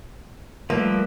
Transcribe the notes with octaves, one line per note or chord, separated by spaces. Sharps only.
F3 G3 A3 A#3 B4 E5